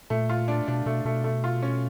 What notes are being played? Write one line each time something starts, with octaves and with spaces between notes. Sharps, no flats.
A#2 A3
F4
D4
B2 D4
B2 A3
B2 A3
A3
F4
C#4